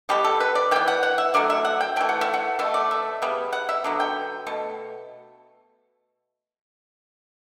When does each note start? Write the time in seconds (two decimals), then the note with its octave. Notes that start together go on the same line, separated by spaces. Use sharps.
0.09 B2 G3 B3 G4
0.24 A4
0.40 B4
0.55 D5
0.71 E3 B3 G5
0.88 F#5
1.03 F#5
1.18 E5
1.34 D3 F#3 A3 D5
1.50 E5
1.65 F#5
1.81 G5
1.96 A3 G5
2.00 E3
2.09 F#5
2.21 E5
2.34 F#5
2.59 B2 A3 E5
2.74 D5
2.91 E5
3.22 C#3 G3 B3
3.53 F#5
3.69 E5
3.84 D3 F#3 B3
4.00 G5
4.47 B2 A3